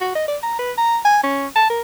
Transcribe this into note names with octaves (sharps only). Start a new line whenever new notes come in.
F#4
D#5
D5
A#5
B4
A#5
G#5
C#4
A5
A#4